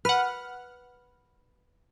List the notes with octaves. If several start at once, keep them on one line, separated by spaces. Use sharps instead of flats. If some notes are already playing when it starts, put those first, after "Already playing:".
B4 F#5 F6